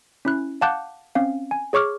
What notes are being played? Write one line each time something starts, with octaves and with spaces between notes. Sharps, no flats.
C#4 E4 F#6
F5 F#5 A5 D6 F#6 G6
C4 C#4 F5
G#5
G#4 C#5 C#6 D6 F6